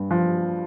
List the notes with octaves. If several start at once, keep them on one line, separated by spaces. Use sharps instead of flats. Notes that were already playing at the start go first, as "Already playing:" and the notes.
Already playing: G2
F3